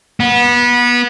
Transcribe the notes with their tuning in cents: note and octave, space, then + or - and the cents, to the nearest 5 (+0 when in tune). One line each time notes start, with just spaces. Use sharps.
B3 -25